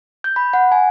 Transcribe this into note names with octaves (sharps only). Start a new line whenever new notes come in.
G6
B5
F#5
G#5